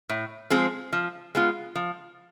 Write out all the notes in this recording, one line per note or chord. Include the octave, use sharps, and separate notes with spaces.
A2
F3 G#3 C4 G#4
F3
G#3 B3 F4
F3